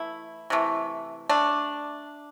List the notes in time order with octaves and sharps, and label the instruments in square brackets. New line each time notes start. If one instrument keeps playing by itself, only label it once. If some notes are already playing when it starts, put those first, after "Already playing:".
Already playing: [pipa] E3 A3 E4
C3 E3 A3
A3 D4